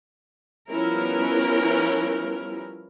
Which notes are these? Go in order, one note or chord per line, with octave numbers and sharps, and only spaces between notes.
F3 G3 B3 C#4 E4 A#4